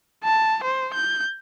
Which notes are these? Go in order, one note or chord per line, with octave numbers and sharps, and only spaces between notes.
A5
C5
G6